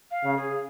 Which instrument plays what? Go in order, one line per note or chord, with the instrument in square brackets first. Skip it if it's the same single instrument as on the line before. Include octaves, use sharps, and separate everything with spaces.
[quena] F5
[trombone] C#3
[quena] G#4